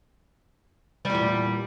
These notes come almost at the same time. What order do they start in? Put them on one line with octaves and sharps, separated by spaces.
G3 E2 A#2